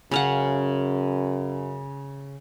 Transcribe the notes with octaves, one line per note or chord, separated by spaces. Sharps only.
F#2 C#3 F5 F#5